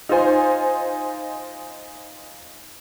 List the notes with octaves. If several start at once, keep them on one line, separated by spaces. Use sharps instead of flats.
D#4 F4 C5 G#5